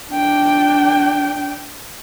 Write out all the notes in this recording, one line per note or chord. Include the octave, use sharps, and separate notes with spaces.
D4 G5